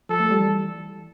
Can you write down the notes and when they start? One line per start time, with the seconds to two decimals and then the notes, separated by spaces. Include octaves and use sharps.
0.09 F3 A4
0.20 A3
0.31 G3
0.40 E3